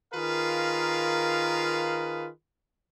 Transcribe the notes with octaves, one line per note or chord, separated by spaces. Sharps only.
D#3 F4 G#4 A#4 B4 F5